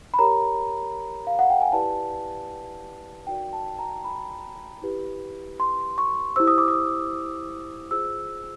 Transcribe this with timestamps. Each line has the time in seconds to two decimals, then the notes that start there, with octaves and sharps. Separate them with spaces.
0.14 B5
0.18 G4 A#4 C#5 A#5
1.27 F5
1.39 F#5
1.50 G5
1.62 G#5
1.72 E4 G4 B4 D5 A5
3.27 D#4 F#4 A#4 D5 G5
3.53 A5
3.79 A#5
4.04 B5
4.82 E4 G4 B4
5.60 C6
5.98 C#6
6.36 E4 G4 C5 E6
6.47 D#6
6.58 D6
6.68 D#6
7.91 F4 G#4 C5 E6